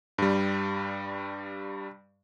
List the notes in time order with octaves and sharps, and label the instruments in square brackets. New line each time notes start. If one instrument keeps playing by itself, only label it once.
[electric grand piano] G2 G3